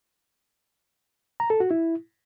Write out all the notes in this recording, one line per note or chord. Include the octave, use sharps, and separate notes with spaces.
A#5
A4
F#4
E4